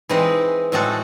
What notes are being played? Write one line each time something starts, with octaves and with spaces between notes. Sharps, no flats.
E3 G#3 C4 D#4
A2 G#3 C4 F#4 A4